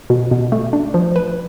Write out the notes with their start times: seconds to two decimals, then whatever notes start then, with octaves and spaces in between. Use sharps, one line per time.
0.10 B2
0.31 B2
0.52 A3
0.73 D4
0.94 F3
1.16 B4